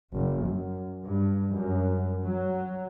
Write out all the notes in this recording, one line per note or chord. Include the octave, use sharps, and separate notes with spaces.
F#1
F#2
G2
F#2
F#3